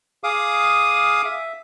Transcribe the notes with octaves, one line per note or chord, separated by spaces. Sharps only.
G#4 F5 D6 D#6
E5